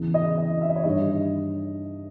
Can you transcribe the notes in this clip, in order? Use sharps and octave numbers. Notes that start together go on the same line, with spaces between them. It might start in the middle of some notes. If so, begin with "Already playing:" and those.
Already playing: E2 C#3 E3
D#5
D#5
E5
D#5
C#5
G2 D#3 G3 D#5